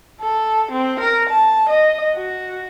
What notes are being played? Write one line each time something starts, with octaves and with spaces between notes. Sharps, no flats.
A4
C4
A#4
A5
D#5
F#4